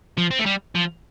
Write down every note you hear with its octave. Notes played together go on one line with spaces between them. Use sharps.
F3
C4
A3
G3
F3